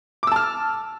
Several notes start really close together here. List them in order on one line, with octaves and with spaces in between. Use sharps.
D6 E6 A5 F6